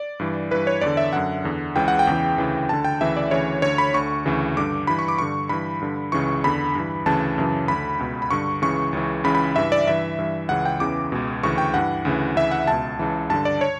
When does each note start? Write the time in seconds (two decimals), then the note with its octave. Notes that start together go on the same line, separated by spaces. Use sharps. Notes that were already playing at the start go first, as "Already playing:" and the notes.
Already playing: D5
0.20 G2 E3
0.51 G2 E3 B4
0.67 C#5
0.81 E2 D3 D5
0.97 E5
1.13 F#2 D3 F#5
1.44 E2 D3
1.76 C#2 C#3 E3 G5
1.88 F#5
1.99 G5
2.07 E2 C#3 E3
2.38 D2 C#3 E3
2.69 D2 D3 A5
2.85 G5
3.01 D2 C#3 E3 E5
3.17 D5
3.31 D2 C#3 E3 C#5
3.62 D2 D3 C#5
3.78 B5
3.94 D2 D3 C#6
4.26 D2 C#3 E3
4.57 G2 D3 D6
4.87 G2 E3 B5
4.99 C#6
5.08 D6
5.18 G2 D3 C#6
5.49 G2 E3 B5
5.81 G2 D3
6.12 C#2 C#3 E3 C#6
6.44 E2 D3 B5
6.75 G2 E3
7.06 D2 C#3 E3 A5
7.38 F#2 C#3 E3
7.68 D2 D3 B5
7.99 C#2 B2
8.22 B5
8.31 G2 D3 C#6
8.62 C#2 C#3 E3 C#6
8.93 C#2 C#3 E3
9.24 C#2 C#3 E3 B5
9.35 B5
9.56 G2 E3 E5
9.72 D5
9.87 G2 E3 E5
10.18 G2 E3
10.49 C#2 C#3 E3 F#5
10.65 G5
10.80 E2 C#3 E3 D6
11.12 C#2 B2
11.43 D2 C#3 E3 C#6
11.58 G5
11.74 G2 E3 F#5
12.05 D2 C#3 E3
12.36 D2 C#3 E3 E5
12.51 F#5
12.67 C#2 B2 A5
12.99 C#2 C#3 E3
13.29 G2 D3 A5
13.45 D5
13.61 C#5